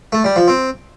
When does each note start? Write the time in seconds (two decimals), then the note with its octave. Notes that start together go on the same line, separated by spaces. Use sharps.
0.13 A3
0.24 G3
0.36 F3
0.48 C4